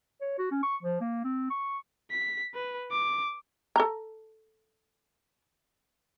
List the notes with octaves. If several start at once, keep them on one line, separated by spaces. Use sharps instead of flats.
C#5
F#4
C#4
C#6
F3
A#3
C4
C#6
B6
B4
D6
A4 A#5